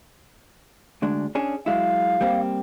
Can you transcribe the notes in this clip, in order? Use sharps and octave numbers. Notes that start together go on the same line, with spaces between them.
D2 G#3 D4
C#4 D4 G#4
F#3 G#3 E4 F5
G3 A#3 C4